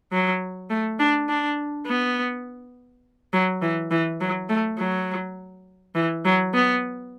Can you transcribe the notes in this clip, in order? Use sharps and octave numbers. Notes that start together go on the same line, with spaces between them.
F#3
A3
D4
D4
B3
F#3
E3
E3
F#3
A3
F#3
E3
F#3
B3